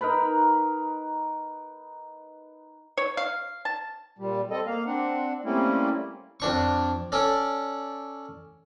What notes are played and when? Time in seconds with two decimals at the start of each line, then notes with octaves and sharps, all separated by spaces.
0.01 D#4 A#4 B4 B5
2.97 C#5
3.17 F5
3.65 A5
4.19 A#2 G3
4.51 C4 A4 D#5
4.67 A#3 F5
4.86 C4 D4 F#5
5.44 G3 A3 A#3 C4 C#4 E4
6.40 F2 D4 C#6
7.12 C#4 A4 D5